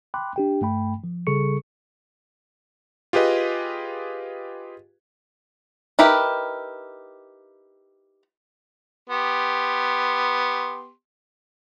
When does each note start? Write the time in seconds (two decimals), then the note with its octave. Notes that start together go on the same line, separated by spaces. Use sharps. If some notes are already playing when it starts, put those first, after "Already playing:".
0.14 G5 B5 C6 D6 F#6
0.36 D4 G4 G5
0.61 G2 A3 G5 B5
1.04 F3
1.27 C#3 G3 G#4 A4 C#6 C#7
3.13 F4 G4 G#4 B4 D#5
5.99 D#4 E4 G4 A#4 B4
9.10 B3 G4 C6